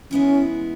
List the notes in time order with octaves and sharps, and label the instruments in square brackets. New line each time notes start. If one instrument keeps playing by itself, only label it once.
[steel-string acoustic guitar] E3 G#3 B3 E4 [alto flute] C#4